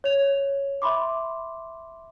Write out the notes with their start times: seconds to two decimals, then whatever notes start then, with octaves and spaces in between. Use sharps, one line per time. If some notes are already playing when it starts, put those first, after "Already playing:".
0.04 C#5 F7
0.82 E5 B5 C6 D6